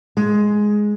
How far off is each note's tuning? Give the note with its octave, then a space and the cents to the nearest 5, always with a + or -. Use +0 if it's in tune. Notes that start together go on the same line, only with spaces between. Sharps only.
G#3 +5